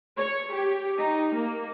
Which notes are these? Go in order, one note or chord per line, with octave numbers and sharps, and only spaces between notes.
C#5
G4
D#4
A#3